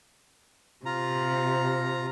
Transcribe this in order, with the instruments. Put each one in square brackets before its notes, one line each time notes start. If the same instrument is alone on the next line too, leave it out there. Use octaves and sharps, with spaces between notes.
[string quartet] C3 [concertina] F4 A#5